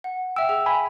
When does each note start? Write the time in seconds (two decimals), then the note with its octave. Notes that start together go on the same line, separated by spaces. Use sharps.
0.04 F#5
0.36 E5 G5 E6
0.49 G#4
0.66 G#5 B5